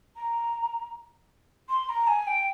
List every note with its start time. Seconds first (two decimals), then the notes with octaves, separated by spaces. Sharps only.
0.16 A#5
1.69 C6
1.89 A#5
2.07 G#5
2.27 G5